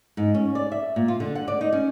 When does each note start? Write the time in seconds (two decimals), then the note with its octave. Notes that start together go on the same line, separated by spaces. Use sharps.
0.17 G#2
0.34 C#4
0.55 D5
0.72 E5
0.96 A#2
1.08 F4
1.20 D3
1.35 F#5
1.48 D5
1.61 D#4
1.73 C#4